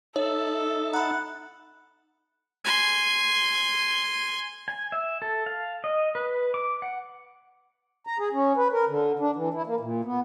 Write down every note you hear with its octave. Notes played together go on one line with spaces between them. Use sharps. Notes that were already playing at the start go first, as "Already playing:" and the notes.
D#4 A4 C#5 E5 A6
F#5 A#5 B5
G#5 C6
G#5
E5
A4
F5
D#5
B4
D6
F#5
A#5
G#4
C#4
B4
A#4
D3
D4
E3
E4
A#3
A#2
B3